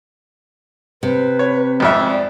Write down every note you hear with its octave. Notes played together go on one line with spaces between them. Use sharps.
C3 B4
C#5
G#1 F2 E5
D5